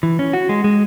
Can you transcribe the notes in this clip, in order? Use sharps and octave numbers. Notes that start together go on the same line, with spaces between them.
E3
C#4
F#4
G#3
G#3